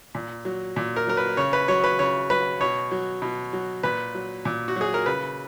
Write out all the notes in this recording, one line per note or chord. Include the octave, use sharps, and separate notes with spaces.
A#2
F#3
A#2
A#4
F#3 A#4
B4
C#3 C#5
B4
F#3 C#5
B4
C#3 C#5
F#3 B4
B2 C#5
F#3
B2
F#3
A#2 B4
F#3
A#2
F#4
F#3 G#4
A#4
C#3 B4